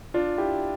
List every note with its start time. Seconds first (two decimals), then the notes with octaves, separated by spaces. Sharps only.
0.14 D4 F4
0.38 E4 G4